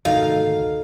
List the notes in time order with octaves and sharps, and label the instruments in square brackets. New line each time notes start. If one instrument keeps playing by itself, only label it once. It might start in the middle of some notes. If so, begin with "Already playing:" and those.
[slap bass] G#1 D2 C3 [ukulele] D#4 [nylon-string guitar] F#4 A4 A#4 [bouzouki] F5